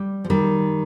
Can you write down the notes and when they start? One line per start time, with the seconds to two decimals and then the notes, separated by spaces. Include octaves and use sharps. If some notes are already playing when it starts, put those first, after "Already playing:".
Already playing: G3
0.24 F3
0.30 D#3 G3